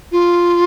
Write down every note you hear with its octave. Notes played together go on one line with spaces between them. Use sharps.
F4